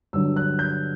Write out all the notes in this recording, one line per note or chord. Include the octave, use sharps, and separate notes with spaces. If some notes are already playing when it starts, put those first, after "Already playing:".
G2 D3 F#3 E6
F#6
G6